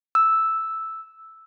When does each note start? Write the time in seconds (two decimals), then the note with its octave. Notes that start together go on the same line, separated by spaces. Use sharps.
0.15 E6